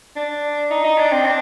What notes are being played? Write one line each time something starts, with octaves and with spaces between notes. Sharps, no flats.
D4
D#4
D#4
D4
C4
D4